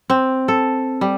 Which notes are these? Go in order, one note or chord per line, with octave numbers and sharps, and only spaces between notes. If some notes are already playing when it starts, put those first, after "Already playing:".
C4
A4
G3